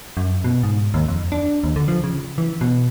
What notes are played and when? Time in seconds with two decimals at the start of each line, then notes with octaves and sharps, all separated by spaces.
0.17 F#2
0.44 B2
0.63 G#2
0.94 D#2
1.08 F2
1.32 D4
1.64 D#2
1.76 D3
1.88 F3
2.04 C#3
2.38 E3
2.61 B2